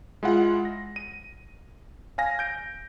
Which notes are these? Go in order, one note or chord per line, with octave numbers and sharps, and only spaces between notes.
G#3 E4 F4 F#5
A#6
D#7
F5 G#5 A#6
G6 D7